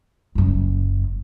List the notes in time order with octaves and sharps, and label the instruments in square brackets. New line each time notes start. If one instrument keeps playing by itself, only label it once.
[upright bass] F#1 F#2